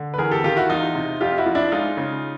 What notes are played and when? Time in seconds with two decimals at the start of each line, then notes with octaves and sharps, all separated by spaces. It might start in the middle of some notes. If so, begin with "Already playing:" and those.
Already playing: D3
0.14 B4
0.18 E2 G#4 A#4
0.31 G4 A4
0.44 D#3 F4 G4
0.57 E4 F#4
0.70 E2 D#4 F4
0.95 C3
1.21 F2 F4 G4
1.38 E4 F#4
1.46 F3
1.55 D4 E4
1.72 G#3 D#4 F4
1.97 C#3